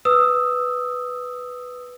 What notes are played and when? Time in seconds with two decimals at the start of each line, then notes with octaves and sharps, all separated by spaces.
0.05 B4 D#6 E6